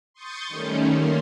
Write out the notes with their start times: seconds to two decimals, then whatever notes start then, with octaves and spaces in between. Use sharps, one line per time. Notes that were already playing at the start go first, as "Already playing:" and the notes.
0.14 C6 C#6 D#6 G6 A6
0.48 D#3 G3 A3 C#4
0.90 A#3 C6